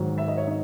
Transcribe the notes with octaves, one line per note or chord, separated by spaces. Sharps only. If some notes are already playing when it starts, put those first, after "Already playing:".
Already playing: G#2 D#3 F#3
E5
D#5
C#5
D#4